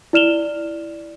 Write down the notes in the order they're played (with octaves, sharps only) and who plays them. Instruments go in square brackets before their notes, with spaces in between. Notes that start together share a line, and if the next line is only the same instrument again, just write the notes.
[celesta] E4 D5 F6 E7 F7 G7